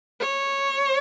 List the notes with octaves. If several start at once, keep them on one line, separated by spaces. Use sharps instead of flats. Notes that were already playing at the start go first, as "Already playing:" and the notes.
C#5